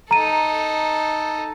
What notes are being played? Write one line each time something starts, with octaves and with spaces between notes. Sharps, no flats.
D#4 A4 A#5 D#7